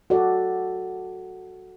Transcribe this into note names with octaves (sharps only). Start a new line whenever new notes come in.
F#4 A4 D5